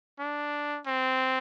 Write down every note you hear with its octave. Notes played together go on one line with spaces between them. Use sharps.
D4
C4